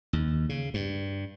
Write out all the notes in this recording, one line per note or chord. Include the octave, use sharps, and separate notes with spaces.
D#2
C#3
G2